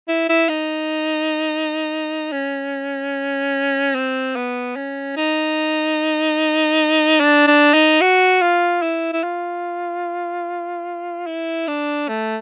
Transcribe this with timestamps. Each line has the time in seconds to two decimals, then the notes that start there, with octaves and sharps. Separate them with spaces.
0.08 E4
0.29 E4
0.49 D#4
2.32 C#4
3.95 C4
4.36 B3
4.76 C#4
5.17 D#4
7.20 D4
7.47 D4
7.74 D#4
8.01 F#4
8.42 F4
8.82 E4
9.13 E4
9.23 F4
11.26 E4
11.68 D4
12.08 A3